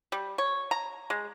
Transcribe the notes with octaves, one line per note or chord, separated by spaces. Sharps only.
G3
C#5
A#5
G#3